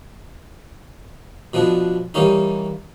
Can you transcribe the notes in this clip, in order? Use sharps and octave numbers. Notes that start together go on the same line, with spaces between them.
B2 F3 B3 D4
E3 G3 A#3 C#4 D#4